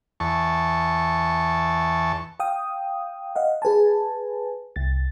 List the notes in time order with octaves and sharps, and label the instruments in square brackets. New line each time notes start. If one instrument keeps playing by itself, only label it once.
[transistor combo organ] E2 A5 C#6
[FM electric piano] F5 G5 D#6
D#5 F5 F#5
G#4 B4 G#5 A5
C2 A6